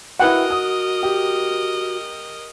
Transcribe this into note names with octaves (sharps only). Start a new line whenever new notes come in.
E4 F#4 A#4 B4 D#5 F#5 G5
D#6
G4